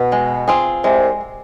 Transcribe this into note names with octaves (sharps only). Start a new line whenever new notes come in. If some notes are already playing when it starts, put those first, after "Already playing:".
Already playing: B2
G#3
C4 F4 G#4
C2 C3 G#3